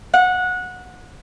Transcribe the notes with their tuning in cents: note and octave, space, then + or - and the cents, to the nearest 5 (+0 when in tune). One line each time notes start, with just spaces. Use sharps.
F#5 -20